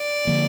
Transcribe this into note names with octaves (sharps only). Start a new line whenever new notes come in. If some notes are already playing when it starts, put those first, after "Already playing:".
Already playing: D5
D3 F3 A#3